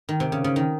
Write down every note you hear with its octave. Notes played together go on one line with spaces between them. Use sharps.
D#3
C3
C#3
C#3
D#3